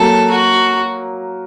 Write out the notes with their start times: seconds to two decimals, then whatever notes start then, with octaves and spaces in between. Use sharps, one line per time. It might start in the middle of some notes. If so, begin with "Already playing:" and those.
Already playing: F#3 A#3 A4
0.31 F#4